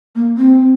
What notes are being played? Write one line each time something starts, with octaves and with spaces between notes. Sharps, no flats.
A#3
C4